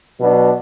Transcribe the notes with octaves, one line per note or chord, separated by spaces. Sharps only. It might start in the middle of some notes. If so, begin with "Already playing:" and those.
B2 F#3 B3 D4